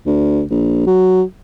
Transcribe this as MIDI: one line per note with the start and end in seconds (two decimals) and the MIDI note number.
0.06 0.42 38
0.50 0.82 34
0.87 1.22 54